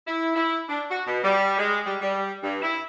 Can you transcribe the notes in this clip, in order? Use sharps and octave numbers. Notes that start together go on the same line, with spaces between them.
E4
E4
D4
F#4
B2
G3
G#3
G3
G3
G2
E4